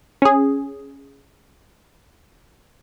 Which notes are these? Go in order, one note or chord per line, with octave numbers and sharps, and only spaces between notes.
C#4 G#4